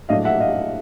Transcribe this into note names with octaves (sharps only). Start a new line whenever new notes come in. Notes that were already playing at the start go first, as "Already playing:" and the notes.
A#1 A2 F#3 A3 D4 D#5 F5
E5 F#5
D#5 F5